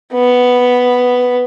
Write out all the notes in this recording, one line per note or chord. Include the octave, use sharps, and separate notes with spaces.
B3